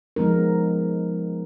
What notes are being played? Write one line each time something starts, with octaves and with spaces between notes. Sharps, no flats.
F3 G#3 B3 D#4 A#4